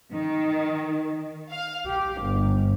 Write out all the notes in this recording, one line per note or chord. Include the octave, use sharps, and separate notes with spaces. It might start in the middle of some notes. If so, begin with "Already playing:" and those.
D#3
F5
G4
G1